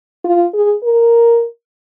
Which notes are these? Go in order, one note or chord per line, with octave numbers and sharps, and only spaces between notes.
F4
G#4
A#4